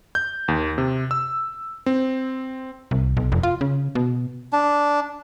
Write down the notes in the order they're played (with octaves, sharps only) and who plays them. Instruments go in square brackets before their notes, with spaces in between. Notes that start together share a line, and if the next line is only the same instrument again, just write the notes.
[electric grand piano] G6
D#2
C3
E6
C4
[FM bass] C2
B1
F1
F4
C#3
B2
[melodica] D4